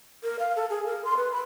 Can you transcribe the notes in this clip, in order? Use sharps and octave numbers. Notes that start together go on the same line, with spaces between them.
A#4
F5
A4
G#4
A#4
C6
B4
B5